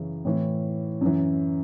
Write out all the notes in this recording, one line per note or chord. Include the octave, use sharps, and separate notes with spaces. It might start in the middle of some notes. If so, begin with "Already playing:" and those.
Already playing: F#2 C#3 E3
A2 E3
F#2 E3